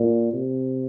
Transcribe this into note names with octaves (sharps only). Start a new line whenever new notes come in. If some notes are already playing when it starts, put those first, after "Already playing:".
Already playing: A#2
C3